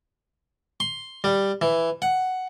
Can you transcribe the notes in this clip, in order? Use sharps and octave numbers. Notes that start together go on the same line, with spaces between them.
C6
G3
E3
F#5